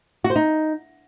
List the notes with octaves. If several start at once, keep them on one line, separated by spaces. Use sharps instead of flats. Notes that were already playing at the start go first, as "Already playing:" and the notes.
F#4
C5
D#4